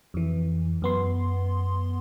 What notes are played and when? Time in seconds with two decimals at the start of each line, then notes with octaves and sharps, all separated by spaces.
0.14 F2 E3
0.82 F#2 B3 C6